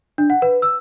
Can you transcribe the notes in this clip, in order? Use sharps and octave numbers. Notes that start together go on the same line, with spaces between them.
D4
F#5
B4
E6